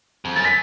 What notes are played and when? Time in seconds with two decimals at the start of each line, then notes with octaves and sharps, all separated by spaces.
0.25 F2
0.35 F#2 A6
0.45 B6